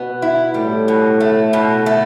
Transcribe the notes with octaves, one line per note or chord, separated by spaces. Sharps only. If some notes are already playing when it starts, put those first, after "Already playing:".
Already playing: B2 B3
E4
A2 G3
B2
A3
B2
A3